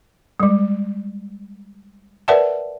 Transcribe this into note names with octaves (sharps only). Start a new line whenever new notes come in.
G3 G#3
A#4 B4 D5 E5 F#5 A5